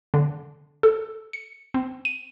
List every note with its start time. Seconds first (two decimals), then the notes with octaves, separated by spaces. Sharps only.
0.14 D3
0.83 A4
1.33 C#7
1.74 C4
2.05 D#7